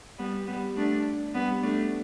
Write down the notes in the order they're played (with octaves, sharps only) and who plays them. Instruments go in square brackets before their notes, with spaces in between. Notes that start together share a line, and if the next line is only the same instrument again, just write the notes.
[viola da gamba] G3 B3
G3 B3
A3 D4
G3 B3
A3 D4